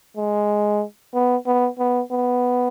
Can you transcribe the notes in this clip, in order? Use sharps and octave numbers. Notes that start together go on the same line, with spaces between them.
G#3
B3
B3
B3
B3